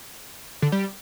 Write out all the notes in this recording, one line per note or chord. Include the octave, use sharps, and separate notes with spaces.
D3
G3